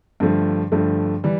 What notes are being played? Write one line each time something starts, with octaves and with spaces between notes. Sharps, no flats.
G2 D3 F3 A3
G2 D3 F3 A3
E3 G3